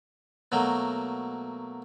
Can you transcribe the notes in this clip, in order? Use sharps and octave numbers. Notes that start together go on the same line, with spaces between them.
B2 F#3 A3 A#3